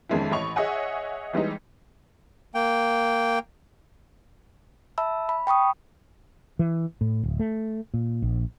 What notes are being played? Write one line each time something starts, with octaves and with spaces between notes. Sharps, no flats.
F2 D#3 G#3 C#4 E4
A1 D#5 B5 C#6 F7
G#4 C#5 D#5 E5 F#5 G#5
E3 G3 G#3 D#4
A#3 G5
E5 A5 B5 E6
B5
G5 B5 C#6 D#6
E3
A2
D1
A3
A#2
A#1